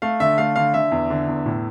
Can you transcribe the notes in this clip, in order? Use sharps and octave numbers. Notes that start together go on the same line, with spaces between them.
A3 F5
D3 E5
A3 F5
D3 F5
D3 E5
E2
D3
E2
A2